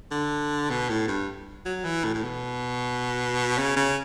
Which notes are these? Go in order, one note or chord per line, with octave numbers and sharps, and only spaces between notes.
D3
B2
A2
G2
F#3
E3
A2
A2
B2
C#3
C#3